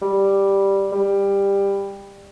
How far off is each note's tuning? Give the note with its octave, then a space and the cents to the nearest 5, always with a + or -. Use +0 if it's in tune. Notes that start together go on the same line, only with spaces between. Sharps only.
G3 +0
G3 +15